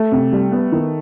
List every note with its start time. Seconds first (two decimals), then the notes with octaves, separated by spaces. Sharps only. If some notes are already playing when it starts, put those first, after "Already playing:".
Already playing: A3
0.12 C3
0.32 G3
0.52 B3
0.72 D#3